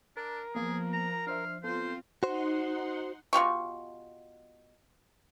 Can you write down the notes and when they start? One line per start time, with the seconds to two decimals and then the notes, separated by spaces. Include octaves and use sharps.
0.17 D4 A#4
0.55 F3 A#3 B3 G#4
0.93 A#5
1.27 D4 C5 E5 F5
1.64 B3 C4 F4 A4 C5
2.23 D#4 F#4 C5 F#5 C6
3.33 B2 F4 G4 C#6